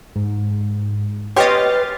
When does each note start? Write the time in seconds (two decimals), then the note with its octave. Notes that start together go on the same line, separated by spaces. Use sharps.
0.16 G#2
1.36 G4 B4 C#5 D#5 C6 F6 A6